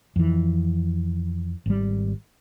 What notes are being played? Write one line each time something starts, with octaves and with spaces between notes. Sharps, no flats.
F2 E3
G#1 G3